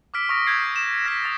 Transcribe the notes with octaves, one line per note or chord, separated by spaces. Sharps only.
D6 E6 F6 B6 D7
C#6 D#6 F6 A#6 B6 D7
E6 F6 G6 G#6 C7 D7
E7
F6 A#6 B6 E7
D#6 A6